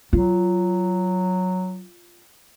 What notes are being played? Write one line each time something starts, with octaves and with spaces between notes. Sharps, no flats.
F#3 F4